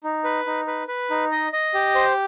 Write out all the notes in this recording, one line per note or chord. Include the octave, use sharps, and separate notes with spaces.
D#4
B4
D#4
B4
B4
D#4
D#5
D#5
G4
C5